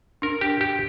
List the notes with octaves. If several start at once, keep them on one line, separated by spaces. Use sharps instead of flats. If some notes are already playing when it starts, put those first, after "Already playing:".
D4 A#4
G4
G4